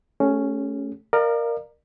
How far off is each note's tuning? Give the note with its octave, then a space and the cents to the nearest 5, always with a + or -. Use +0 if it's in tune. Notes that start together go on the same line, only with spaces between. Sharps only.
A3 +0 C#4 +0 G4 +45
A#4 +0 D5 +40 F5 -15